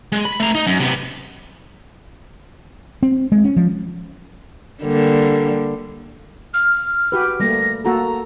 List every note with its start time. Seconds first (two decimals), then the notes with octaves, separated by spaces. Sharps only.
0.12 G#3
0.25 B5
0.40 A3 A#5
0.55 D#4
0.67 F#2
0.80 C3 B3
3.03 C4
3.32 G#3
3.45 C#4
3.57 F3
4.83 D3 G3 A#3
6.53 F6
7.12 F#4 G4 B4
7.40 G3 A3 A#3 A#6
7.85 A#3 F#4 A4 A#5